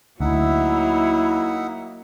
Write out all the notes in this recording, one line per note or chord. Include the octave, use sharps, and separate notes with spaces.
D2 F#3 A#3 D#4 E4 E5 F#5